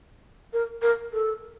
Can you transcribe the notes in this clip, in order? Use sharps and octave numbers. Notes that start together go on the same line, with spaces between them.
A#4
A#4
A4